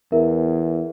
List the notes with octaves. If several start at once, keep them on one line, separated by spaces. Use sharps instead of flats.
E2 E4 A#4 E5